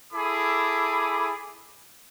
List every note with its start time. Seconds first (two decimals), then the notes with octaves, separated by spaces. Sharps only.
0.13 E4 G#4 A4 B5 D6